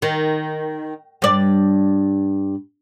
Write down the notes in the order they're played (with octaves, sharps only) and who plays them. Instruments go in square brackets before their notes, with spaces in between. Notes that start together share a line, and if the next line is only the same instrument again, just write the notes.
[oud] D#3
G2 D5